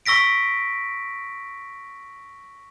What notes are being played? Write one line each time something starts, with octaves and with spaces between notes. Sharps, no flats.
C#6 E6 A#6 B6 D7